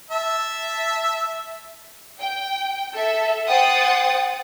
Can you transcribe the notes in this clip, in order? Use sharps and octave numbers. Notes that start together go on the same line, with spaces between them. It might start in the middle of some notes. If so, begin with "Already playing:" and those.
E5 A5
G5
A4 E5
C5 F#5 G5 D#6 A6